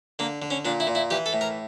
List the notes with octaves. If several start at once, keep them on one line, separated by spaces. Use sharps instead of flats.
D3 A#3
D3
C#4
A#2 D4
E4
A#2
E4
E3 G4
A4
A2
A#4